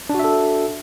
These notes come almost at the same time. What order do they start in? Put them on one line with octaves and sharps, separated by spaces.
D4 F#4 E5 A4